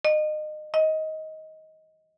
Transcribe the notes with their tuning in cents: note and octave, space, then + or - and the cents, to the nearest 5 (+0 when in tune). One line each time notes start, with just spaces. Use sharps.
D#5 -30
D#5 +15